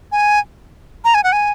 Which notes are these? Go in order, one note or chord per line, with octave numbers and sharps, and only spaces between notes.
G#5
A#5
G#5
F#5
G#5